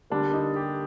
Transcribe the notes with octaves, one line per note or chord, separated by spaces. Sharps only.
D3 G3 A#3 D4
D#4
G4